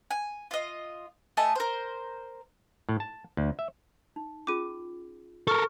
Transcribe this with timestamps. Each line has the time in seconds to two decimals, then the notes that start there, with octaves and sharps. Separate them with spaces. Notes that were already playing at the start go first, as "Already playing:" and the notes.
0.11 G#5
0.51 F4 D#5
1.37 A3 D#5 G#5 A5
1.55 A#4 C5
2.89 A2
3.00 A5
3.37 D2
3.59 E5
4.16 D#4
4.47 C#4 F4 G#4 D6 D#7
5.47 A4 A#4 C#6 F6